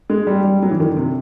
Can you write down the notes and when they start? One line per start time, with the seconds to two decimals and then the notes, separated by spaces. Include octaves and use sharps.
0.10 G#3
0.27 G3
0.44 G3
0.62 F#3
0.71 E3
0.80 D#3
0.88 D3
0.97 C3